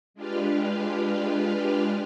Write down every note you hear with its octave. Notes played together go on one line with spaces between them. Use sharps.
G#3 D4 F4 G4 B4 F5